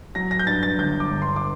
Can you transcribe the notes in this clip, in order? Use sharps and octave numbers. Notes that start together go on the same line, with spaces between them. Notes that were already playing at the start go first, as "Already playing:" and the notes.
F#3 A#6
A#6
G6
G2 A6
A6
G1 G6
D6
G1
C6
D6